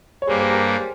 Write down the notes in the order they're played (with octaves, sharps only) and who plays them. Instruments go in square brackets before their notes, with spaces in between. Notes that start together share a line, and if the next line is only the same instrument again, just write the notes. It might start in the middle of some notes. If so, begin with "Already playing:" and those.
[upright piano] C#5
[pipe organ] G2 G3 A#3 [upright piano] G#4 C5
[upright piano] G#4 C5
G4 A#4